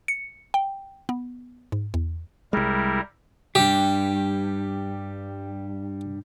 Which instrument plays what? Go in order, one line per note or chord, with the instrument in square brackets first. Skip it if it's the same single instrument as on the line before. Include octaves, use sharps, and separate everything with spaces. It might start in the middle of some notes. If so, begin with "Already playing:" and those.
[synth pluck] C#7
G5
B3
G#2
E2
[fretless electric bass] C2 G#3 [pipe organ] G3 E4 A#4
[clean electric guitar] G2 G3 [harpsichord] G4